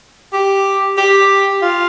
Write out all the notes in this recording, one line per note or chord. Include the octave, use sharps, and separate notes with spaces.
G4
G4
F4